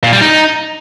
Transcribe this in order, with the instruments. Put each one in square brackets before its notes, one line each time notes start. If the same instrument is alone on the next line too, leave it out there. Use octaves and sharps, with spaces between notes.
[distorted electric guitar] A#2
G3
D#4